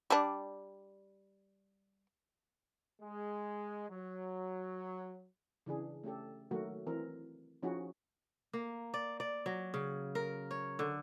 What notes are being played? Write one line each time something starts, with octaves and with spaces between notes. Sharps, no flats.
G3 D4
G#3
F#3
C#3 E3 D4 G#4
A3 C#4 G4 A4
D#3 F#3 A3 A#3 F#4 A#4
E3 C4 A#4
F3 C#4 D#4 E4 F#4 G#4
A#3
D5
D5
F#3
C#3
A#4
C#5
D3